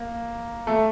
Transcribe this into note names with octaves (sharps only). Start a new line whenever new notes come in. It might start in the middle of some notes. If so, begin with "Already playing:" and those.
Already playing: A#3
A3